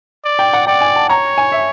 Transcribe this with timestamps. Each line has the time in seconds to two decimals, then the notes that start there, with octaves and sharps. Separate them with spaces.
0.24 D5
0.39 G5
0.53 F#5
0.67 D5 G5
0.81 G#5
0.96 A5
1.09 C#5 A#5
1.38 G#5
1.52 E5